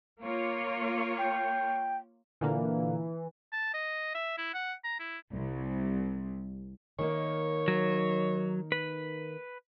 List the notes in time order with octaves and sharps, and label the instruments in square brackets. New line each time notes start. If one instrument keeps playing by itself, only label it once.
[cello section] A#3 F4 C#5
[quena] G5
[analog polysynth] A#2 D3 A#3 [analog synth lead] E3
[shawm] A5
D#5
E5
E4
F#5
A#5
E4
[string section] C2
[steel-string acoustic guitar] D#3 A#3 D#4 [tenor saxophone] C#5
[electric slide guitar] F#3
B4